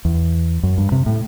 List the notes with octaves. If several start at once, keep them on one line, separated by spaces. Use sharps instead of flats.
E2
F#2
G2
C3
A2